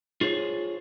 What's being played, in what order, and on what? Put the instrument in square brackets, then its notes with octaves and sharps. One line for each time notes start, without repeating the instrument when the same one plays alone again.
[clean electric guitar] F4 G#4 C5 C#5